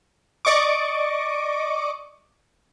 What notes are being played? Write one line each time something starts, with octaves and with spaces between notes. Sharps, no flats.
D5 D#5 C#6 D6